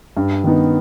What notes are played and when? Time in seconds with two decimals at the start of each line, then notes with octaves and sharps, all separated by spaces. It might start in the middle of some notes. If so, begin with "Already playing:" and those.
0.17 G2
0.44 D#3 B3 D#4